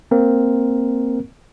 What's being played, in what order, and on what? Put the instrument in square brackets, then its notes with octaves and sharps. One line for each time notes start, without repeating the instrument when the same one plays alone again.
[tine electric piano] A#3 C4 A#4